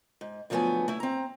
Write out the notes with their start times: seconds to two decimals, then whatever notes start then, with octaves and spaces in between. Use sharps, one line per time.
0.21 G#2
0.50 D3 F3 F#3 A3 B3 G#5
0.88 A3 E4
1.00 C4 A#5